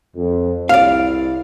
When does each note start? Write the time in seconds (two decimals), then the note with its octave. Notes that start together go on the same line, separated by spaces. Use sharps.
0.16 F2
0.69 C2 E4 D5 F5